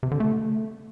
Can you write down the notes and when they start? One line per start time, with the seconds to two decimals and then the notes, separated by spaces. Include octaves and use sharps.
0.03 C3
0.11 D3
0.20 A3